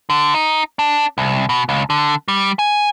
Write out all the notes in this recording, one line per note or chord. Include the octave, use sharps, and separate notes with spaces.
D3
D#4
D4
C2
B2
C#2
D3
G3
G#5